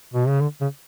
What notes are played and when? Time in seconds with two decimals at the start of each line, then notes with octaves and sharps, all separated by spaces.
0.14 B2
0.28 C#3
0.41 D3
0.61 C#3